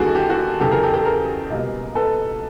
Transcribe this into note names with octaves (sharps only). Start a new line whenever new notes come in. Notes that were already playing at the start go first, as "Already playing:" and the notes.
Already playing: D#2 D3 G3 A#3 F#4 G#4 A4
G4
F#4
E2 C#3 F#3 G4 A4
G#4 A#4
G4 A4
G4 A4
G#4 A#4
C#2 B2 G3 A#3
A4 B4